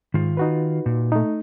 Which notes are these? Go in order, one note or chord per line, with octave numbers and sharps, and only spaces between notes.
G#2 D#3 F4
D#4 F#4 B4
A#2
A3 D#4